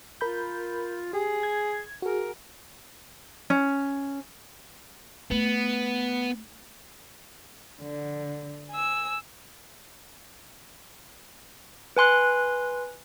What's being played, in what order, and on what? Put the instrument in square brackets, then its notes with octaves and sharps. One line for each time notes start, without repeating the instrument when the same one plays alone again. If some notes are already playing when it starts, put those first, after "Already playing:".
[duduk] F4 [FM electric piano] A#4 B5 G6
[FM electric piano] G4 [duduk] G#4
[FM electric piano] G#6
[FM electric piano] F#4 G#4 [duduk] A#4
[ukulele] C#4
[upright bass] A3 [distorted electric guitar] B3
[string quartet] D3
G#5 E6
[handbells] B4 G#5 C6 F#6